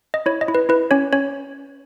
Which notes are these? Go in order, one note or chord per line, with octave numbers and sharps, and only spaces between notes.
D#5
E4 C#5
D#5
E4
B4
E4 B4
C#4 C#5
C#4 C#5